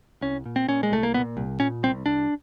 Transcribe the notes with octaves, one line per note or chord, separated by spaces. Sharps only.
C2 C#4
A#2
C4
A#2 C#4
G#3
C2 A3
A#3
A#2 B3
C2
A#2 C#4
C2 C4
C2 D4